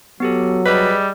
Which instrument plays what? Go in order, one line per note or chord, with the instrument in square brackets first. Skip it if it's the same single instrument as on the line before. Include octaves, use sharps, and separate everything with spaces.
[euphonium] F#3 [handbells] B3 G4 A4
[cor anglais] G3 [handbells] G#4 D#5 [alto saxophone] B4